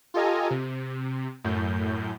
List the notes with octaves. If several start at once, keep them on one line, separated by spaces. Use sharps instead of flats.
F4 G4 A4 D#5 G#5 A#5
C3
F#2 A2 G6